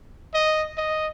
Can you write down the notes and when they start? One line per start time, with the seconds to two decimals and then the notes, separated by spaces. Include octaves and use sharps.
0.34 D#5
0.78 D#5